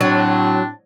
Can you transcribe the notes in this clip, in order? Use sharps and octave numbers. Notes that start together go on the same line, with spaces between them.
A2 F#3 C4 D4